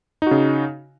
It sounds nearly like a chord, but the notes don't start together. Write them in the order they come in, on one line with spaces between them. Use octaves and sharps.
D#4 F#4 C#3